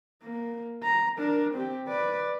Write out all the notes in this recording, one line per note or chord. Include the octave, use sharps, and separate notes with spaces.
A#3
A#5
D4 A#4
C4 G4
B4 D5